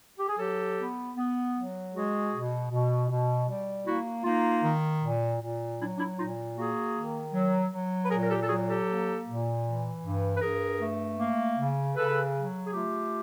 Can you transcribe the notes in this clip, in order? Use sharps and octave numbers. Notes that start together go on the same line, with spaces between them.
G4
G#4
F#3 G4 A4
B3
B3
F#3
G#3 F#4 G#4
B2
B2
B2
G3
A#3 E4 F#4
A#3 D#4 F4
D#3
A#2
A#2
F#3 D4 E4
D4 E4
A#2 D#4 F4
A#3 F#4 G#4
D#3
F#3
F#3
B4
A#2 G#4 A#4
A#4
G4 A4
A4
F#3 F#4 G#4
G4 A4
A#3
A#2
E3
G2
B4
G2 G#4 A#4
A3
A#3
C#3
C#3 A4 B4
F#3
G#4
A3 F4 G4